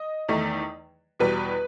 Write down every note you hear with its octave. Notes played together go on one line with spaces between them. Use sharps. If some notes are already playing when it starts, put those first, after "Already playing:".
Already playing: D#5
E2 D#3 A3 D#4
E2 B2 G3 B4